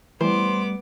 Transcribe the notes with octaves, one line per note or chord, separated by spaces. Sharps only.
E3 G3 A3 B3 C5 D6